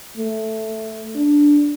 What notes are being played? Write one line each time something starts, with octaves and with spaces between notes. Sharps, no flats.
A3
D4